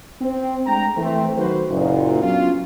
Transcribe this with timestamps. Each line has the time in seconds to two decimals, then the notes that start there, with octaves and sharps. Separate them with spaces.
0.21 C4
0.66 G#3 A3 D4 G5 A#5
0.97 E3 A3 C4
1.37 D#3 F#3 F#4 A4 B4 C5
1.70 F#1 A#2
2.22 F#3 B3 C#4 D4 F4